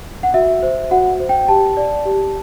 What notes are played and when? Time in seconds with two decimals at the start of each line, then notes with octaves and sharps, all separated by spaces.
0.23 F#5
0.34 F#4 E5
0.62 C5
0.91 F#4 F#5
1.20 C5
1.29 G5
1.48 G4 A5
1.77 D5
2.05 G4